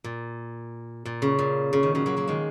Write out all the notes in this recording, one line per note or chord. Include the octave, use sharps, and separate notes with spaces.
A#2
A#2
C#3
A#2
C#3
D#3
C#3 F#3
F#3 A#3
F#3 A#3
D#3 G#3